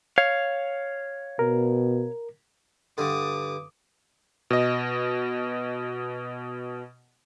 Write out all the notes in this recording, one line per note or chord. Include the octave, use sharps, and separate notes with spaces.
C#5 F5
B2 A#4
G2 D3 D6 D#6
B2 D#5